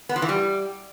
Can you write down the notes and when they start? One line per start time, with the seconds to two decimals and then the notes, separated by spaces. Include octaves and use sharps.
0.09 B3
0.16 F3
0.22 E3
0.29 G3